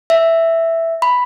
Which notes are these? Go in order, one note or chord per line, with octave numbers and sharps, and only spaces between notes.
E5
B5